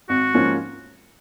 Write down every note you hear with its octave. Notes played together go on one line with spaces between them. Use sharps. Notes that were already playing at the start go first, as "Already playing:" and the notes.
G#1 F#4
G#2 F3 A#3 C#4